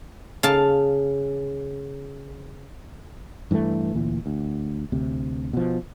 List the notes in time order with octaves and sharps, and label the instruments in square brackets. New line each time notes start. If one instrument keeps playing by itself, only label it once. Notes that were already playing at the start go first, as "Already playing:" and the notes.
[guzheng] C#3 F5 A5
[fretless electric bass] G2 E3 G3 A3
D2 A#2 E3
D2
D2 C3
B2 F3